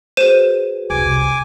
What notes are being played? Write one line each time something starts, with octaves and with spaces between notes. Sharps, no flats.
F#4 G#4 B4 C5 D#7 E7
E1 C2 G#5 D6